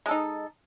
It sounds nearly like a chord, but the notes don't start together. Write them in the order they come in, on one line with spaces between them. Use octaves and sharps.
G#3 A4 D#4